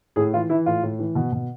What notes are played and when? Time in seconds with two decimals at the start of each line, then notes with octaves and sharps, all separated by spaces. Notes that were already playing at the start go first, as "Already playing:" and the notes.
0.16 A2 G#4
0.33 E3 F4
0.49 E3 E4
0.66 A2 F4
0.83 A2
0.99 E3
1.15 B2
1.32 B2